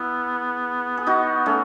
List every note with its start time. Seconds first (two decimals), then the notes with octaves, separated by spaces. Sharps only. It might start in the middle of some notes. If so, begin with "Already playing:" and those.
Already playing: B3 E4 G#4
0.97 G#4
1.07 D#4 F#4
1.46 A3 C#4